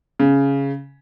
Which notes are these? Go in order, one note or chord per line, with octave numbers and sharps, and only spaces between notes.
C#3